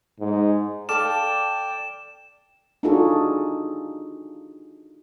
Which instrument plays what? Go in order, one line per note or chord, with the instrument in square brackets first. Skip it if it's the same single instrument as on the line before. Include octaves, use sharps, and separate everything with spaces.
[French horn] G#2
[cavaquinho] A4 F5 A5 [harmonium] D5 G5 [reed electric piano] D6 F6 [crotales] E7
[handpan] D4 D#4 F4 F#4 G#4 A4